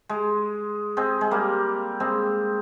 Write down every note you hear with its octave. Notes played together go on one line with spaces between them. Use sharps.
G#3
G#3 C4
G#3
G3 A#3
G#3 C4